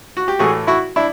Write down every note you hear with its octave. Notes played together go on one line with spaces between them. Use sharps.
F#4
G4
A2 E3 A3 F#4 G#4
E4 F#4
D4 E4